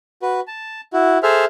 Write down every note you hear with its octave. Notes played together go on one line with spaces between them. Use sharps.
F#4 B4
A5
E4 F#4
G#4 A4 C5 E5 F6